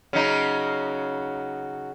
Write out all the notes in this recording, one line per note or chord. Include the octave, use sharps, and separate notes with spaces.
C#3 F#3 D#4